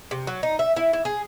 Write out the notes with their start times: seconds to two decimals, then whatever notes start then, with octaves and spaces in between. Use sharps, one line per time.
0.11 C3
0.27 F#3
0.43 D#4
0.59 E5
0.76 E4
0.93 E4
1.05 G#4